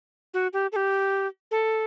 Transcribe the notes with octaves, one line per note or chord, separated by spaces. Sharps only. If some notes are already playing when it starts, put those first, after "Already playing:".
F#4
G4
A4
G4
A4